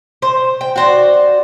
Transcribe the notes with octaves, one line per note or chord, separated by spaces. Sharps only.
C5
G5
F#4 C5 D5